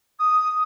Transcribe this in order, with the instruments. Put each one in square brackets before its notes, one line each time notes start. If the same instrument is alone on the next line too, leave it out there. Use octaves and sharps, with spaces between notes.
[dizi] D#6